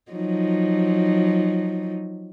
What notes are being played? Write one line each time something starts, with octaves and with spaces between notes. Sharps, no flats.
F3 F#3 D#4